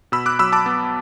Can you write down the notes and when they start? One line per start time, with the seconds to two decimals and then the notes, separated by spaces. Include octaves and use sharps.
0.12 B2 B5 E6
0.26 D6 F#6
0.39 F#3 B5 E6
0.52 A5 D6
0.66 B3